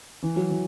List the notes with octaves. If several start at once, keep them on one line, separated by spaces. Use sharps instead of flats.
E3
F#3
E3